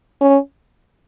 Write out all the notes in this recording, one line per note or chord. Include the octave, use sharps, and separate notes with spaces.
C#4